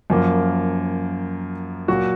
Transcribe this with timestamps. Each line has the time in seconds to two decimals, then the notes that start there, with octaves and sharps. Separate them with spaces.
0.10 F#2 F3 A#3
1.88 A#2 F#3 A#3 F#4